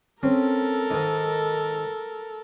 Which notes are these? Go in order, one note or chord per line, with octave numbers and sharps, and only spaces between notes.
C4 C#4 A4 A#4
G#2 D#3